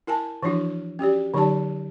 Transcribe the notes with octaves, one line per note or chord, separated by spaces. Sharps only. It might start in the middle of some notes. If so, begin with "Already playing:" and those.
E4 A#4 G#5 A5
E3 F3 D4 E4 F#4
C#4 F#4 G4 D5
D3 F#3 D#4 G4 D5 A5